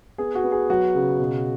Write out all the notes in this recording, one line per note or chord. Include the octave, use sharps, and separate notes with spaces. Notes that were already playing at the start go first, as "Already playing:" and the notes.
B3 G#4
F#4
B3
G#4
F#3 F#4
C#3
B2